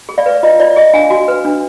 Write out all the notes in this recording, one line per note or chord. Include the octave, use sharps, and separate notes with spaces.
G#4
D5 F5
B4
F4 D#5
F4 D5
G#4 D#5
D4 F5 G#5
F#4
B4
D4